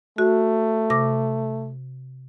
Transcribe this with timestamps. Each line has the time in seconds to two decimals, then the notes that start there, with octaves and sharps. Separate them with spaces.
0.18 A3 F#4
0.90 C3 D6 A#6